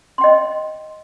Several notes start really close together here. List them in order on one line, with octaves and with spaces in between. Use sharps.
C6 G5 D#5